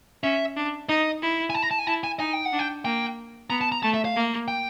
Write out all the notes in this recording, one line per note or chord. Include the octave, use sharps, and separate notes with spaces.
C#4 E5
D4
D#4 D#5
E4
G#5
A5
A#5
A5
G#5
E4 A5
G#5
D#4 G#5
G5
F#5
D4
G5
A#3 G5
B3 A#5
A5
A#5
A3 A5
E5
F5
A#3
G5